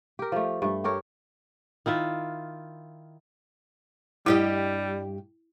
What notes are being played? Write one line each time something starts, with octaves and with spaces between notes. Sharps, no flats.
G4 A#4
F3 A3
G2 A3
G4 A4 A#4 C#5
D#3 E4 F4 E5
G2 G3 E4 G4 D#5